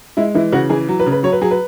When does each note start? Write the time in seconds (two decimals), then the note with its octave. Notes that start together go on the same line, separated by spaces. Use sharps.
0.17 G#3 E4
0.35 E3 E4
0.52 C#3 F#4
0.70 E3 G#4
0.89 F#3
0.99 B4
1.06 C#3
1.12 B4
1.23 F#3 C#5
1.32 B4
1.41 F#3 G#4
1.51 B4